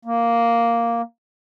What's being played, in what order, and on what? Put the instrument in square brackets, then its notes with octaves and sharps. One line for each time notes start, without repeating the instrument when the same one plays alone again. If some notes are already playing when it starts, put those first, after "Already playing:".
[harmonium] A#3